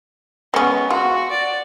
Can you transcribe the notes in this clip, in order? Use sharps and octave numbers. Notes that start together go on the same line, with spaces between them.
G#3 B3 C#4
F4 F#4
D5